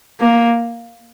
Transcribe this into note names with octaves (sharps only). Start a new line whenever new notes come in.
A#3